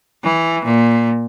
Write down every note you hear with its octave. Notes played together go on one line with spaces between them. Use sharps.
E3
A#2